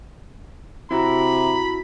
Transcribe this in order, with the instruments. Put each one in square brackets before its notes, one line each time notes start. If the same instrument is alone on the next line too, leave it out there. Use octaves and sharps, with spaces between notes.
[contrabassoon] C3 [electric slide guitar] E4 F#4 [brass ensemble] A#5 [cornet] B5